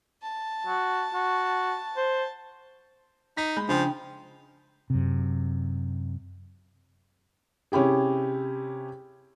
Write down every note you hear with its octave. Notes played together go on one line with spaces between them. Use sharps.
A5
F#4
F#4
C5
D#4 B6
G#3 B5 G6
C#3 F3 D4 G5 G#5
F#2 C3
C3 C#4 E4 G4 G#4